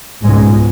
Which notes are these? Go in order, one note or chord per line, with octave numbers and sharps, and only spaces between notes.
C#2 G#2 B2 G#3